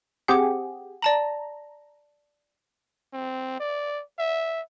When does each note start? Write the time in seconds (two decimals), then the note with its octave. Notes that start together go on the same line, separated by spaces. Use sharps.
0.28 C4 G4 G#4 F#5 D6
1.02 D5 A5 A#5 F#7
3.13 C4
3.60 D5
4.19 E5